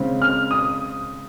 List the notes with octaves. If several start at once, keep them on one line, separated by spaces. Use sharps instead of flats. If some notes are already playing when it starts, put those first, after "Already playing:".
Already playing: C#3 G#3 C4
F6
D#6